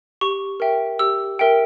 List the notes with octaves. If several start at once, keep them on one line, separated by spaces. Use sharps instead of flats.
G4 C#6
A#4 E5 G5
G4 E6
A#4 E5 G5